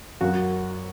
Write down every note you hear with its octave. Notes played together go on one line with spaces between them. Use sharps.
F#2 F#4